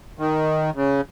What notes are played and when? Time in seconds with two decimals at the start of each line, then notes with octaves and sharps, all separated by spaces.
0.19 D#3
0.75 C#3